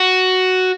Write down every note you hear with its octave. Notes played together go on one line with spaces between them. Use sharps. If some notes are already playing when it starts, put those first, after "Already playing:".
Already playing: F#4